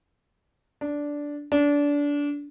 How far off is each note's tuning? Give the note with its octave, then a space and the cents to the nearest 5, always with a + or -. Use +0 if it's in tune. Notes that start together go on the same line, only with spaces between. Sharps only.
D4 -10
D4 -25